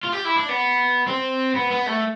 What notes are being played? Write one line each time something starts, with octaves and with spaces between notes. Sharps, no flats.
F4
G4
E4
D4
B3
C4
B3
B3
A3